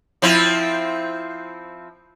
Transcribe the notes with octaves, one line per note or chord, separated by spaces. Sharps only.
F3 C4 E4